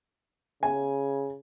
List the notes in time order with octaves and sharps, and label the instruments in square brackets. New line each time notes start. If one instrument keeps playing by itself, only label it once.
[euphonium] C#3 [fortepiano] G#5